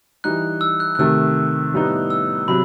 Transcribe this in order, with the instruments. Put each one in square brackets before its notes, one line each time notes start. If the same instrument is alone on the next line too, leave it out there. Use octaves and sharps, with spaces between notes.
[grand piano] E3 G3 D#4 [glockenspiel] F#6
[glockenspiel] E6
F#6
F#6
[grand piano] C3 D#3 A3 [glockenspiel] E6
[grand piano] A2 G3 B3 D#4
[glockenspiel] E6
[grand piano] C3 F#3 [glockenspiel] B5